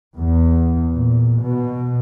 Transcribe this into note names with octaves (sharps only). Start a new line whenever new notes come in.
E2
A#2
B2